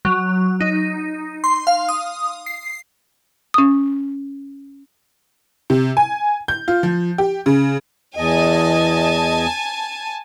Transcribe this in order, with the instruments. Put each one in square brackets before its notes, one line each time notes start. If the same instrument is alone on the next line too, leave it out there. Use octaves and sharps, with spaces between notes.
[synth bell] F#3
D#4
C6
F5
D#6
C7
[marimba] C#4 D#6
[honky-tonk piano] C3
G#5
G6
F4
F3
G4
C#3
[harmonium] E2 D#5 [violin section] G#5 A5